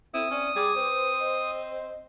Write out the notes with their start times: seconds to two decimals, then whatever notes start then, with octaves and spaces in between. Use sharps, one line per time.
0.14 C4 E4 A4 D#6
0.31 C#4 D5
0.56 G3 G#4 D6
0.76 C4 B4 C5
1.19 D#5